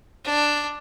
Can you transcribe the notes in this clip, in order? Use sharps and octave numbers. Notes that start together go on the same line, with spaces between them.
D4